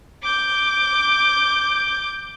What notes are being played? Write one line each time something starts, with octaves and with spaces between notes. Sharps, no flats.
D6 G6